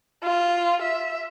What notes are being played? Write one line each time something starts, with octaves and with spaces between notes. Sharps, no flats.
F4
E5